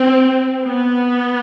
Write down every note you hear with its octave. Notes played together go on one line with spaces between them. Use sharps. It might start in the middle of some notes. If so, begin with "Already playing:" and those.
Already playing: C4
B3